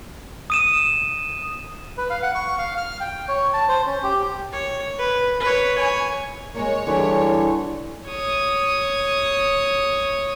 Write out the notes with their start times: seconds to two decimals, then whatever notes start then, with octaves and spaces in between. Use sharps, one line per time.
0.50 D#6 D#7 E7
1.98 B4
2.10 F5
2.23 F#5
2.35 C#6
2.58 F5
2.77 F6
3.01 G5
3.29 C#5
3.53 A5
3.69 C5
3.86 C#4
4.03 G4
4.52 C#5
4.99 B4
5.40 B4 C#5
5.78 C#5 G#5
6.55 G#3 A#3 C#5
6.87 D3 E3 G3 G#4
8.07 C#5 D#6